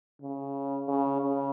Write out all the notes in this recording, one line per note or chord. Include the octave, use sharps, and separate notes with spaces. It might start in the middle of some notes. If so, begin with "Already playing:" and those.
C#3
C#3
C#3